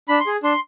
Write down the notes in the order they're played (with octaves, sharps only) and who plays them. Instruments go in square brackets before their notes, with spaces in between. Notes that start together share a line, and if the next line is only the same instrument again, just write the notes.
[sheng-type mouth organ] D4 B5
C6
G#4
D4 C6